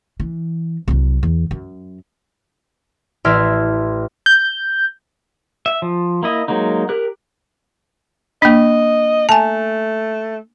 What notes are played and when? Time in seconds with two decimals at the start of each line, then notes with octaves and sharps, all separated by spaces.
0.20 E3
0.88 C2 F#3
1.23 E2
1.51 F#2
3.25 A1 D5 E5 C6 F6 G#6
4.26 G6
5.66 E5
5.82 F3
6.23 A#3 E4 D#5
6.48 F#3 G#3 A#3 D#4
6.89 G4 A#4 F#6
8.42 A#3 D4 D#5
9.29 A3 G#5 A5